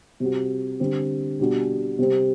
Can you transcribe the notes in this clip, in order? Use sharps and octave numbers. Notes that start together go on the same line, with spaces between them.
C3 G3 C4 F#4
D3 G3 C4
B2 G3 D4 F#4
C3 G3 C4